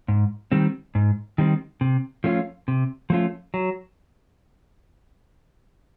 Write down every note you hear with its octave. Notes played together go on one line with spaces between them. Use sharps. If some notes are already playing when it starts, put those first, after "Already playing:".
G#2
D#3 G3 C4
G#2
D#3 G3 C4
C3
F3 A3 C#4 F4
C3
F3 A3 C#4 F4
F#3